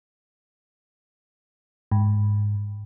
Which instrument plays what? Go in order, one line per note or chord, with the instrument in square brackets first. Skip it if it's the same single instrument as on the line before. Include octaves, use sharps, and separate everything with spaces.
[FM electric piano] G#2